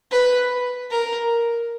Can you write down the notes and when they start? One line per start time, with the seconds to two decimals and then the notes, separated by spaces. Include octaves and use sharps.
0.12 B4
0.91 A#4